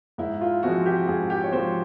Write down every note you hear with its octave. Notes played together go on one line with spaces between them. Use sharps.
G#2 E4
F4
F3 G#3 C4 F#4
G4
G#2 G#4
G4
C#5
F3 G#3 C4 C5